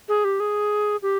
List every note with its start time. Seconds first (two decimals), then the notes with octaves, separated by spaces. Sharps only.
0.09 G#4
0.24 G4
0.40 G#4
1.02 G4